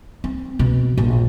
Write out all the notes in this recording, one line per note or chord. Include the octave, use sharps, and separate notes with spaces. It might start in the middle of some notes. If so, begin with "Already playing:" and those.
C4
B2
A#1